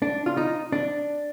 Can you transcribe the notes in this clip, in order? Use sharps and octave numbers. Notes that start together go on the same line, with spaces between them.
D4
F4
D#4
D4